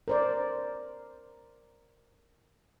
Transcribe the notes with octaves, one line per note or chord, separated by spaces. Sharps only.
A#4 C5 D5